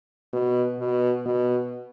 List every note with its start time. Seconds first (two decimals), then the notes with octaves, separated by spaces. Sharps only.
0.33 B2
0.79 B2
1.25 B2